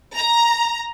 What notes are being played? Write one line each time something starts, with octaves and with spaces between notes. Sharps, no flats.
A#5